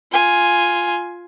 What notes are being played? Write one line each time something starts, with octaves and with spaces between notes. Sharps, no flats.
F4 G#5